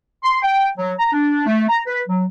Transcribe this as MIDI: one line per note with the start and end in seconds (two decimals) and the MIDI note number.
0.23 0.38 84
0.43 0.68 79
0.78 0.93 54
0.99 1.09 82
1.12 1.43 62
1.47 1.64 57
1.68 1.81 82
1.87 2.02 71
2.08 2.25 54